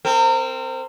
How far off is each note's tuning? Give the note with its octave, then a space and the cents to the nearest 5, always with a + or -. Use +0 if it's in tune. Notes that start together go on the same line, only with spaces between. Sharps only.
C4 -5 A#4 -30